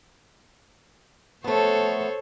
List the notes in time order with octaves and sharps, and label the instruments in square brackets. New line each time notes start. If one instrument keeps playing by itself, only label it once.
[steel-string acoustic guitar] A3 B3 [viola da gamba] A4 C5 C#5